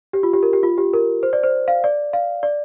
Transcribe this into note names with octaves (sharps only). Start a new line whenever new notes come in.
G4
F4
G4
A#4
G4
F4
G4
A#4
C5
D5
C5
F5
D5
F5
D5